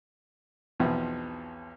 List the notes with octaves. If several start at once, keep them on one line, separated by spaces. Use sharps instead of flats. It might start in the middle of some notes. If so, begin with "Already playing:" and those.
B1 E2 B2 F3 C4 E5